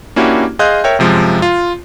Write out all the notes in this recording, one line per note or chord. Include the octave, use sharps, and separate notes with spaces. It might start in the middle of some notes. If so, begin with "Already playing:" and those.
A#3 C#4 D4 E4 F#4 G4
G#4 D#5 F5 C6 F#6 G6
A#4 C#5 E5 G5
F#2 C3 F3 G#3
F4